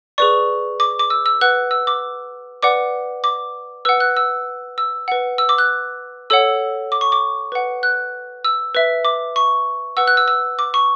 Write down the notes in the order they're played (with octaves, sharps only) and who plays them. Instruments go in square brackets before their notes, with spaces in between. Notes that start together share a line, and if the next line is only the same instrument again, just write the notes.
[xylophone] G#4 B4 D5 C#6
D6
D6
E6
E6
B4 F#5 F#6
E6
D6
B4 D5 F#5 D6
D6
B4 F#5 E6
F#6
E6
E6
B4 F#5
E6
D6
F#6
A4 C#5 F#5 E6
D6
C#6
D6
B4 F#5
F#6
E6
B4 E5
D6
C#6
B4 F#5 E6
F#6
E6
E6
D6
C#6